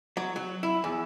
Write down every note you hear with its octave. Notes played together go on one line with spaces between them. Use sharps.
F#3
F#3
E4
E2